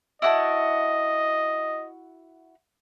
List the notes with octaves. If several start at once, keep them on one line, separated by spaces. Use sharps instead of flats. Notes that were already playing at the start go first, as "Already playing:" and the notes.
E4 F#4 D#5 A5